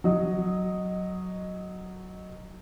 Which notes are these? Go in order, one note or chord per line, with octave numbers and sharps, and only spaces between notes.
F#3 D#5